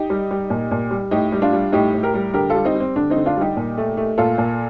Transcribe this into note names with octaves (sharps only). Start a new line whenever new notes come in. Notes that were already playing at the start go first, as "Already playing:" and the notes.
Already playing: D#4 G4
G3
G3
A#2
A#2
G3
A2 D#4 G4
G3
D4 F4
G3
A2 D#4 G4
A2
G4 A#4
G3
D3 G4 A#4
F4 A4
G3
C4 D#4
G3
C4
D3 D4
C4 D#4
D3
D4 F4
G3 D#4 G4
A#2
A3
A3
A#2 F4 A4
A#2